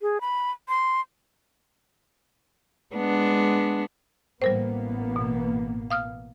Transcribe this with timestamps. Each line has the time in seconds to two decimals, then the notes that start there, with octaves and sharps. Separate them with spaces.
0.01 G#4
0.21 B5
0.69 C6
2.96 G#3 B3 D4
4.42 A1 G3 A#3 B3 A#4 C5
5.16 B2
5.90 F5 D#6 F6